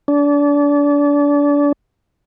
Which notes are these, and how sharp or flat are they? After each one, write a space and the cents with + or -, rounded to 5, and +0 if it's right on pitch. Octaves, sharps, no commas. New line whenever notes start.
D4 -30